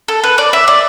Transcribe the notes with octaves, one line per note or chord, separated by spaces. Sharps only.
A4
B4
D5
E5
D5